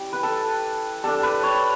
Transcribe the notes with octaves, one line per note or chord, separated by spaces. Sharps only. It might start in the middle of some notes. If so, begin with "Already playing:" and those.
Already playing: G3 C#4 E4 G4
B4
A4
G3 D4 A4
B4
C#5